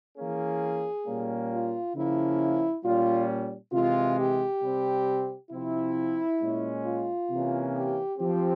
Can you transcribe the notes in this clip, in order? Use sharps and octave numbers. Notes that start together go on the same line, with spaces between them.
E3 A#3 C#4 G#4
A#2 G3 A#3 C#4
F4
C#3 F3 A#3 C#4 E4
A#2 G3 C#4 F4
C3 E3 G#3 F4
G4
C3 G3 C4
C3 F3 C4 E4
A#2 G#3 C#4
F4
C3 E3 A#3 C#4
G4
F3 C4 G4